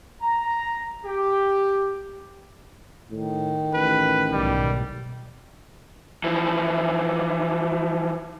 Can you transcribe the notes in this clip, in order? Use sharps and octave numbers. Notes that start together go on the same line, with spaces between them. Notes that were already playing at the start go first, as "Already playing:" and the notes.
A#5
G4
A2 D#3
A1 B4
B1 G#2 G3
E3 F3